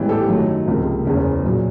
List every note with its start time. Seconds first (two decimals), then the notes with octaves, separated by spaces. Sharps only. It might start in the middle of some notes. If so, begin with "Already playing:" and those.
Already playing: A1 G#2 E3 G3 B3
0.09 G4 A4
0.28 F#2 D#3 F#3 A3
0.67 C#2 C3 F3 A#3
1.05 F#1 E2 C#3
1.43 B1 A#2 F#3